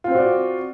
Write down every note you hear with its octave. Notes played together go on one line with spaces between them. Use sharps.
C4 F4 F#4 C5 D5